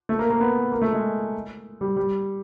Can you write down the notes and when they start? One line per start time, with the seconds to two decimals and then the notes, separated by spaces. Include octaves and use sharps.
0.09 A3
0.19 A#3
0.30 A#3
0.40 B3
0.72 A#3
0.82 A3
0.93 G#3
1.81 G3
1.97 G3